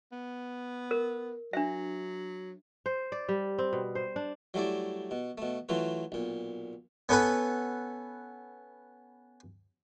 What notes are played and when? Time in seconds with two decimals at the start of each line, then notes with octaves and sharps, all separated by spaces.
0.12 B3
0.91 A#4
1.53 F#3 D4 E5
2.86 C5
3.12 D5
3.29 G3
3.59 C4
3.73 B2
3.95 C5
4.16 D4
4.54 F#3 G3 A3 E4 D5
5.11 B2
5.38 B2 A3
5.69 E3 F#3 A3 F4 B4
6.12 B1 A#2
7.09 B3 C#4 A4 B4